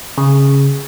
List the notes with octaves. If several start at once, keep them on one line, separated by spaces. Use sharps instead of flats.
C#3